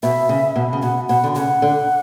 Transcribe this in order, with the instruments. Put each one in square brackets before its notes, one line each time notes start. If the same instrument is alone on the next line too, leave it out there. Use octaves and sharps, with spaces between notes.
[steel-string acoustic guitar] B2 [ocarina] E5
[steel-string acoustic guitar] C#3
B2
C#3
[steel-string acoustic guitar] B2 [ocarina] F#5
[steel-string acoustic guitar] B2 [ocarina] F#5
[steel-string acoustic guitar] D3
[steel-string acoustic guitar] C#3 [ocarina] F#5
[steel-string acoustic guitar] D3